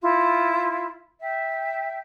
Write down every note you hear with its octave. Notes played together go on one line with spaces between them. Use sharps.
E4 F4
E5 G5